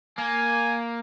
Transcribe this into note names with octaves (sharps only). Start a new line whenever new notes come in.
A#3 G#5